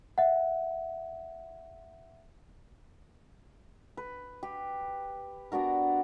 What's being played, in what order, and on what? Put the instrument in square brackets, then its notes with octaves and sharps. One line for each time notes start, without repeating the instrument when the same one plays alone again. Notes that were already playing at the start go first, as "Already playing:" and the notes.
[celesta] E5 F#5
[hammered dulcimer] B4
G4
B3 D4 F#4 A#4